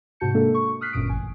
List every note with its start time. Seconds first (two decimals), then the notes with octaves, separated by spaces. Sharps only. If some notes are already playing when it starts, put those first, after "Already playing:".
0.20 G#2 C3 F#4 A5 G6 C#7
0.34 G#3 A#3 D4 A4
0.54 C#6
0.81 D#6 F6 F#6 B6 C7
0.93 G1 F#2 A#2 D#6 D7
1.09 A1 G#5